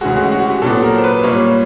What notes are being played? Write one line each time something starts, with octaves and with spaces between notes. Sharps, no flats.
D2 C#3 E3 G#3 F#4
F#4
F#4
G4
A#2 F#3 B3 A4
A#4
C5
B4
A#2 G3 A#3 C#5